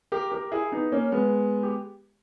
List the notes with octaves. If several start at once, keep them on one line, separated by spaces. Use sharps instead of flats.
G4 A#4
G4 A#4
E4 G#4
B3 D#4
A#3 C#4
G#3 B3
G4